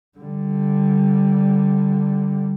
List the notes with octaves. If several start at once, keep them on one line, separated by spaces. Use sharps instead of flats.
D3 G3